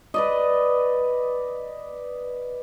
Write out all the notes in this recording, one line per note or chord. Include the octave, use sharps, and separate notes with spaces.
B4 D5 D#5